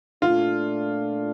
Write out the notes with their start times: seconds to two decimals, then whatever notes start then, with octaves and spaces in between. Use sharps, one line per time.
0.22 A#2 A3 D4 F4